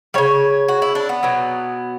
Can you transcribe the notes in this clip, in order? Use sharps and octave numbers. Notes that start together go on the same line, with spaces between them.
C#3 G3 C#5
F#4
E4
D4
B3
B2 F#3